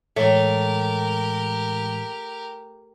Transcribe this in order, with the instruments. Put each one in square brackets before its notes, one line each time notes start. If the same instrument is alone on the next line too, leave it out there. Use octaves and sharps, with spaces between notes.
[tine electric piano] A2 E3 G#3 [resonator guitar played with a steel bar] A3 [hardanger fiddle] G4 A#4 [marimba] A4 C#5